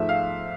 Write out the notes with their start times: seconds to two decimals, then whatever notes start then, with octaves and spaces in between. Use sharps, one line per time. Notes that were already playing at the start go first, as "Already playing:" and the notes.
Already playing: G#2 F3 A3 E5
0.09 F5